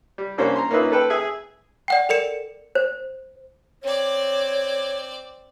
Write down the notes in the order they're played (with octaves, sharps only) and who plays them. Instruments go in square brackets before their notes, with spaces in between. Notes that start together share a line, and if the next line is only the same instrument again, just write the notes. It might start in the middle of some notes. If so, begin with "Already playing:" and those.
[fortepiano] G3
C2 G3 A#3 C#4 D4 C5
A#5 C6
A#3 C#4 D#4 F4 B4 E5
A4 B4 G5
G#4 E5 G#5
[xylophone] D5 F#5 G5
A4 A#4 D5 C#7 E7
[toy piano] C5
[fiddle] C4 D5 [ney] C#5